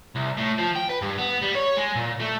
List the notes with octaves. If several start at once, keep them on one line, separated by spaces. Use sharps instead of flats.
C2
A2
F3
G5
B4
G2
B3
G3
C#5
G#3
A#2
A3